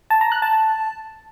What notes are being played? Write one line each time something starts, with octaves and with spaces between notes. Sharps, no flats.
A5
A#5
F#6
A5